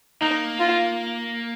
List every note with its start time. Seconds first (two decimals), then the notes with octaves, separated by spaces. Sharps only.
0.21 A#3 D#4
0.60 F4